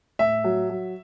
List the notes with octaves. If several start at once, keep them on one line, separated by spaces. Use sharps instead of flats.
A2 E5
F#3
F#3